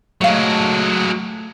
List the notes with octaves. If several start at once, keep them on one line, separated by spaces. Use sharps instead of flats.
F#3 G#3 A3 F5